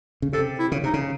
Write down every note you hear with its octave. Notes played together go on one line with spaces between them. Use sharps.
C#3
C3 A4
E4
C#3
C3 D#4
C#3